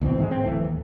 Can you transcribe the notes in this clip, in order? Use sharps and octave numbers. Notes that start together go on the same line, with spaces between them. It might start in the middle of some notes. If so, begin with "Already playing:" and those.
D2 B2 E3 C4
G#2 D#3 F#3 G#3
C4
D1 E3 A3
D#2